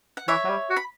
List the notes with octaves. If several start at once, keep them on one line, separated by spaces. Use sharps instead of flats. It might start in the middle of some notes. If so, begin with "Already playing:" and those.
F#5
E3 C#5 E5
F#3
G3
F#4
B5